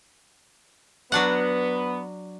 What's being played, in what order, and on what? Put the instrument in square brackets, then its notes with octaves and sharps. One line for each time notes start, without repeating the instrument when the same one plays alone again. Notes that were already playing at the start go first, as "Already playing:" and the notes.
[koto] F#3 D4 F#5 [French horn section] B3